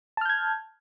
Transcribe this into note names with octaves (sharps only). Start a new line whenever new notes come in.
A5 F6 G6 G#6